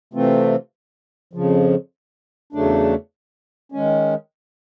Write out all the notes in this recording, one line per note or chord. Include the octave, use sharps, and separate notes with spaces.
C3 E3 A3 C4 F4
F2 C#3 F3
E2 C#3 F#3 A3 D4
D#3 G#3 C#4